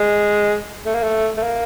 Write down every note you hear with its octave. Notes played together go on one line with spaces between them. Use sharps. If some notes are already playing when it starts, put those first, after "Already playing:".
Already playing: G#3
A3
A#3
A3
A3
A#3